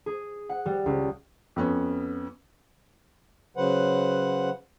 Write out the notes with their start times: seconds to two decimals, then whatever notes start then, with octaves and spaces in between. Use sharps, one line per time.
0.06 G#4
0.49 F#5
0.66 G3
0.86 C#2
1.56 F2 B3 C#4
3.57 C#3 F#3 B4 C5 F#5